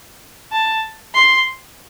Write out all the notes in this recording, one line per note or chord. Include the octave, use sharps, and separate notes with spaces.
A5
C6